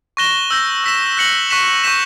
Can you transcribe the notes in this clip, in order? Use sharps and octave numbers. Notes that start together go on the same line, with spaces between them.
C#6 F#6 A#6 E7 G7
E6 G6 A#6
E6 B6 E7
F#6 A#6 C#7 F#7
C#6 F#6 B6 E7
C#6 G6 B6 E7